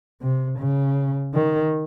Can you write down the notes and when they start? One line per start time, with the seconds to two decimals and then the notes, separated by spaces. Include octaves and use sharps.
0.22 C3
0.59 C#3
1.34 D#3